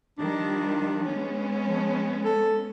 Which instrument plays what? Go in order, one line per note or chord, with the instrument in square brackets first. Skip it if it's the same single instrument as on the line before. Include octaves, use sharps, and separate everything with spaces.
[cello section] D#3 F3 G3 [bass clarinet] D4
[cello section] G#3 B3 C#4
[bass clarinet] F3
A4